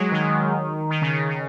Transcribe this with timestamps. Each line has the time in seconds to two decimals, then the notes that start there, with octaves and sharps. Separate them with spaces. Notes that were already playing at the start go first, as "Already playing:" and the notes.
Already playing: F#3 G#3
0.12 D#3
0.90 D#3
1.02 C#3
1.12 D#3
1.29 C#3